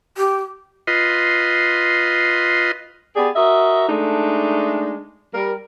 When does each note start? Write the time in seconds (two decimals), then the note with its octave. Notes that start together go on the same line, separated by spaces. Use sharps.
0.18 G4
0.87 F4 B4 D#5 C6
3.16 B3 G4 G#4 D5
3.36 F#4 A#4 D#5 E5
3.89 G#3 A3 D4 D#4
5.34 G3 A#4